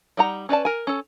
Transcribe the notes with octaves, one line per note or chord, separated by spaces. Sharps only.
G3 D#4 F#5 A#5
C#4 B4 D5 A5
A#4 G#5
C#4 A4